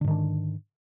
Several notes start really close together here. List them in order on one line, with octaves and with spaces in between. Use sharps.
D3 G#2 D#3 D4